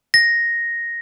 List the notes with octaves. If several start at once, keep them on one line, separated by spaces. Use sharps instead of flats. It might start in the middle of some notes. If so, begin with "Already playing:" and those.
A#6